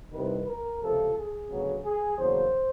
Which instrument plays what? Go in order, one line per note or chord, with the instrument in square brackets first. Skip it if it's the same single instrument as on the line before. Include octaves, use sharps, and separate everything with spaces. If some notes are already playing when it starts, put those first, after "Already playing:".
[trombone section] C2 C3 D#3 B4
A#4
C#2 C3 F3 A4
G#4
D2 C#3 F#3 B3
G#4
E2 C#3 F#3 A#3 C5